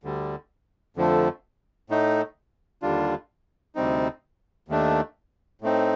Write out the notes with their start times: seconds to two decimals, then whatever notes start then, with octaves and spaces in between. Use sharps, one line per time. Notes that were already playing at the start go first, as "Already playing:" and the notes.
0.04 D2 D3 G3
0.97 F2 D3 F3 A3
1.90 A2 A3 D#4
2.82 D#2 D3 G3 D4 F4
3.75 D2 C3 G3 C4 D#4
4.68 D#2 D#3 A3 D4
5.61 A2 A3 C4 D#4